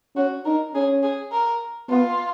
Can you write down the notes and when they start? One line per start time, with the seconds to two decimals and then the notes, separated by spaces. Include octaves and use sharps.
0.16 C#4 F#4
0.45 D#4 A#4
0.74 C#4 G#4
1.03 G#4
1.32 A#4
1.89 B3 F4